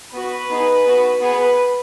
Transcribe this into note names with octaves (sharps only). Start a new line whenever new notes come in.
B3 F#4 B4
B3 D#4 G#4
B3 F#4
B3 G#4 B4